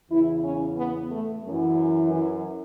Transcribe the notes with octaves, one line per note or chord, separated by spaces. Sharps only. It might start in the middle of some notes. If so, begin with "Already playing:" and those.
E2 C#3 E3 E4
C#4
B3
A3
F#2 E3
E3